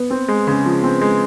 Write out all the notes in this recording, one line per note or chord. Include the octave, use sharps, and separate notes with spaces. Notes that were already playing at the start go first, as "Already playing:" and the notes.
Already playing: B3
C4
G#3
C#3
F3
C4
G#3